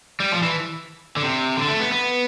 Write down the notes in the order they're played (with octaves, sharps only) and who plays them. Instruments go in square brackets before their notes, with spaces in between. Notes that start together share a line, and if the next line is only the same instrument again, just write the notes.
[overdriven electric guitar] G3
F3
E3
D3
C3
D3
A3
B3
B3